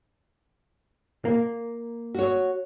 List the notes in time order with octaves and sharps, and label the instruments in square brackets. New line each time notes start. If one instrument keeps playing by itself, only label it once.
[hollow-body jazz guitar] A#3
[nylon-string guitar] F#4 C#5